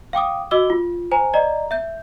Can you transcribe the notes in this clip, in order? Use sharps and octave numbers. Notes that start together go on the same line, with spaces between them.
F5 G5 D6 D#6
F#4 D#5 D6 E6 G7
F4
C5 G#5 A#5
D5 D#5 A#5
E5 G6